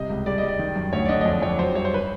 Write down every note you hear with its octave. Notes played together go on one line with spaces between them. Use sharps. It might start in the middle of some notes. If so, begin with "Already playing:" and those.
Already playing: C3 G3 D#5
C#2
G3 D5
D#5
G3
D5
D#3
F#2
D2 C#5
D5
D3 D#5
D#5
F2 D5
F2 C#5
F#3 C5
G2 C#5
C5
B4